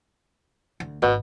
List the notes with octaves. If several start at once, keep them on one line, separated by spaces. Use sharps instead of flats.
D2
G#1 B2